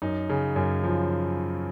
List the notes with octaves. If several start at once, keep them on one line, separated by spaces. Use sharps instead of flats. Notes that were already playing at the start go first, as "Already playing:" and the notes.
F#2 D#4
C#3
F#2
F3